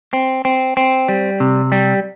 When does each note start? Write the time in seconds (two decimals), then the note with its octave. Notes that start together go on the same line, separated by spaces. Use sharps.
0.13 C4
0.45 C4
0.77 C4
1.09 G3
1.40 C3
1.72 G3